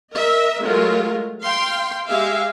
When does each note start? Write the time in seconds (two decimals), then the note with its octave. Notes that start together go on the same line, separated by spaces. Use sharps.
0.13 A#4 D#5 E5
0.61 F#3 G#3 A3 F4 A#4
1.42 F5 G5 C6
2.07 G#3 G4 G#4 E5 F5